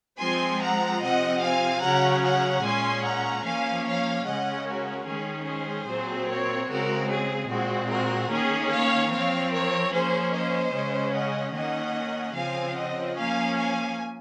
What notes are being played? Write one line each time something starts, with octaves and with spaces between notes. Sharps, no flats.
F3 G#3 C4 G#5 C6
F#5 A#5
C3 F3 C4 D#5 F#5
F5 G#5
C#3 F#3 C#4 F#5 A#5
F#5 A#5
A#2 G#3 C#4 G#5 C6
F#5 A#5
F3 A#3 C#4 F5 G#5
C#5 F5
C#3 G#3 C#4 D#5 F#5
F#4 A#4
D#3 G#3 C#4 G#4
G#4 C5
A#2 F#3 C4
A#4 C#5
C#3 G#3 C4 F#4 A#4
G#4
A#2 G#3 C4 F#4
F#4 A#4
D#3 A#3 C#4 G#4
C#5 F5
F3 C4 C#5 F5
A#4 C#5
F3 A#3 C#4 G#4 C5
C5 D#5
C#3 G#3 C#4
D#5 F#5
D#3 A#3 C#4 D#5 F#5
C#3 F3 C4 F5 G#5
D#5 F#5
F3 A#3 C#4 F5 G#5
F5 G#5